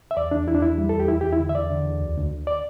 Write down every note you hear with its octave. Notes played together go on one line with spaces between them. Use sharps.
E5
E2 D5
E2 D4
E2 E4
D4
E2 E4
G3
E2 A4
G4
E2 E4
E2 G4
E4
D3
E5
E2 D5
D3
E2
D2
D2
D2
D5